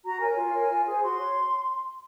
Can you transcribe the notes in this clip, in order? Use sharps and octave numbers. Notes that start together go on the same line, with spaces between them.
F#4 A#5
A#4 C#5 G#5
F4
A#4 C#5
F4
G#4 C5
F#4 C6
C#5